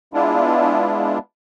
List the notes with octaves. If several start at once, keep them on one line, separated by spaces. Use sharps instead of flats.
G#3 B3 D4 E4 F4